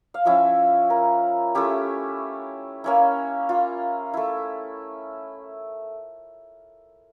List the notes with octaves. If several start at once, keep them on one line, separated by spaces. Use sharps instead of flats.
F5
F3 C#4 E4 E5
A#4
A3 C#4 E4 G4
A#3 C#4 E4
F4
A3 E4